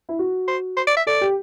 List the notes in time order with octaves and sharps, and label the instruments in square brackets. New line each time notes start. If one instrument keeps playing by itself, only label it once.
[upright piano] E4
F#4
[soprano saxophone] C5
C5
D5
E5
[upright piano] A4 [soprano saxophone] D5
[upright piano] G4